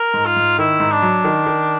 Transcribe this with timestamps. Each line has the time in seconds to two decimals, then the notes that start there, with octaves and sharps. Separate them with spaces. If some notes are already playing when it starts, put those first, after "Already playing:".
Already playing: A#4
0.14 G#2
0.26 F4
0.37 G#2
0.59 D#3 E4
0.80 G#2
0.92 D4
1.02 F#3
1.24 D#3
1.47 D#3